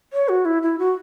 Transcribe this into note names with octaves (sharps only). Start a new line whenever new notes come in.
C#5
F#4
E4
E4
F#4